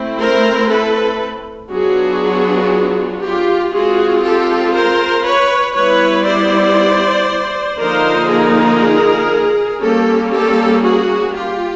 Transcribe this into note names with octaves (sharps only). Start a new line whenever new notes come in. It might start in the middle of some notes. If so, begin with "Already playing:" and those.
Already playing: A3 C4 E4
A#4 C5
A4 B4
F#3 B3 D4 F4 F#4 G#4
F4 G4
G#3 C4 F4 F#4 G#4
G4 A4
A#4 C5
B4 C#5
G3 B3 E4 B4 C#5
C5 D5
D3 F3 A#3 D#4 A#4 C5
G#4 A#4
G3 A#3 C#4 G4 A4
G4 A4
F#4 G#4
F4 G4